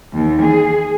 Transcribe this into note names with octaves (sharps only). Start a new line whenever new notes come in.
D#2
G#4